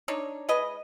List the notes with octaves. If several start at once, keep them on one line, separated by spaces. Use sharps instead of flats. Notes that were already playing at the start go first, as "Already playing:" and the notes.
D4 D#4 C#5
G#3 B4 D#5